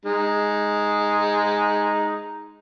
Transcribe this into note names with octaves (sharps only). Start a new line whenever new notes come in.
G#3 D#4